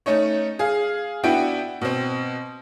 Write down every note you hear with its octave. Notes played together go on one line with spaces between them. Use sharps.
A3 C#4 D#4 C#5
G#4 F5
B3 D4 E4 F#4 G5
B2 C4